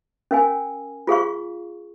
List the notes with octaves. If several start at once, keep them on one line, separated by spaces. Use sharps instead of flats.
C#4 A#4 F5 G#5
F4 G#4 F5 C#6